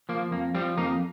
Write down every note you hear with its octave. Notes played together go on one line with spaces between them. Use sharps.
F3 A#3
F2 A#3
F3 G3 C4
F2 A#3 D#4